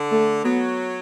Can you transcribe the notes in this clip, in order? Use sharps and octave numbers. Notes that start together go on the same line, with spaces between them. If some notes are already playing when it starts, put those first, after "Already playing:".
Already playing: D3
A3
F#3 B3